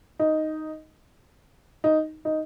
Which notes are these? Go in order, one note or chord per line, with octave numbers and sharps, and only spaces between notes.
D#4
D#4
D#4